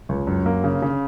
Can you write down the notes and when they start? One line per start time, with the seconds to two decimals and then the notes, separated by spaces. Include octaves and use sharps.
0.09 C#2
0.27 F#2
0.46 A#3
0.64 C#3
0.82 C#3